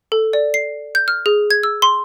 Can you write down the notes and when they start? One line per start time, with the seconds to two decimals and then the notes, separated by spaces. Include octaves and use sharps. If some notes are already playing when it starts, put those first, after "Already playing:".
0.12 A4
0.33 D5
0.54 C7
0.95 G6
1.08 F6
1.26 G#4
1.51 G#6
1.63 E6
1.82 C6